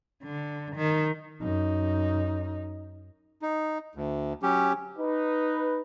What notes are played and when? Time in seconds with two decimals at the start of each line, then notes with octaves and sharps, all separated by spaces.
0.23 D3
0.76 D#3
1.40 F#2 D#4
3.42 D#4
3.95 D2
4.43 F#3 C#4 G4
4.98 D#4 B4